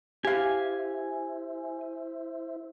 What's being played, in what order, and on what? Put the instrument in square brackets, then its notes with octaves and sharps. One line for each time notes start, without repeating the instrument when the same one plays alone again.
[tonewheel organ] E4 C5 E5 [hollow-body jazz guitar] G4 F5 [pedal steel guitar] G#5